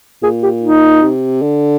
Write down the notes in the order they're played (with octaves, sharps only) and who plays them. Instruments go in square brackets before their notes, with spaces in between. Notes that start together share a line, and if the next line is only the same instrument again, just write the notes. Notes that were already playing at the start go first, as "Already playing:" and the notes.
[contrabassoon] A#2 [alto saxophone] G#4
[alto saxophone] G4
D#4
[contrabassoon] C3
D3